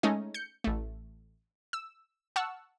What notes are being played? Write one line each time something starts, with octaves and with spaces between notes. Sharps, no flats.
G#3 A3 C#4 D#4 D#5
G6 C#7
A1 A3
E6
F#5 A5 C#6 E6 F6